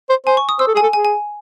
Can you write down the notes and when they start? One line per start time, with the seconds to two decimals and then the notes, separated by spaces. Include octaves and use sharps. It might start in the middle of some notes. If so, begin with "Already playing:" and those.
0.10 C5
0.26 C5 G#5
0.37 C#6
0.49 D#6
0.59 C5 E6
0.67 A4
0.75 G#4 G#5
0.82 A4
0.93 G#4 G#5
1.05 G#5